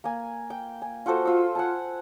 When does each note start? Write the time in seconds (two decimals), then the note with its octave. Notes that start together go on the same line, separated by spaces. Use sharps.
0.04 A#3 G#5
0.50 G5
0.82 G#5
1.06 F4 F#4 A4 C5
1.26 F4 E6
1.55 F#5 G#5 A5